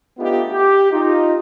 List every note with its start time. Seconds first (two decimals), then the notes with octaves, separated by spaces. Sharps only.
0.18 A3 B3 D4 D#4 F4 G4
0.51 G4
0.91 D#4 F4